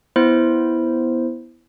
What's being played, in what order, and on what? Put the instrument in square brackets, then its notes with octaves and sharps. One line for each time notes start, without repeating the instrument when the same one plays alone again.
[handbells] B3 E4 C5